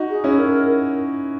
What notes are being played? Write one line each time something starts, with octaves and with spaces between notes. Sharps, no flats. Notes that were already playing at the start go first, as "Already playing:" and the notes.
Already playing: D#4 F#4
G#4
C#4 E4
A#4